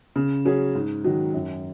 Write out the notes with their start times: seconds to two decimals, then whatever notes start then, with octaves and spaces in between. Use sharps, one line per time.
0.16 C#3
0.45 F#3 C#4 G#4
0.75 G#2
1.04 D#3 F#3
1.34 F#2